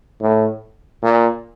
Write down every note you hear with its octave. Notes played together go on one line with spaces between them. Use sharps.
A2
A#2